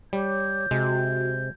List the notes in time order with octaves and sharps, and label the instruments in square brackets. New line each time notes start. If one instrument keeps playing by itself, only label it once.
[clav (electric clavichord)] G3 [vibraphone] C#5 D6 [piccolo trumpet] G6
[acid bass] C3 [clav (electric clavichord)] G#3 [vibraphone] F#4